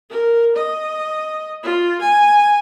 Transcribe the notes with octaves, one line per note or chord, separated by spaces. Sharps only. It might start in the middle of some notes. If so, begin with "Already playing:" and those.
A#4
D#5
F4
G#5